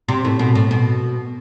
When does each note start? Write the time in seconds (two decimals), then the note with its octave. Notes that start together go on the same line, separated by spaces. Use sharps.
0.08 C3
0.25 A2
0.39 B2
0.55 A2
0.71 B2